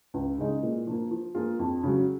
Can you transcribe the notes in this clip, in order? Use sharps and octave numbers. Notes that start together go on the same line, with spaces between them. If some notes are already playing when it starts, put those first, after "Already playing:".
C#2
C#3 G#3 D#4
A#2
F3 A#3
F3
A#3 F4 G#4
F2
C#3 F#3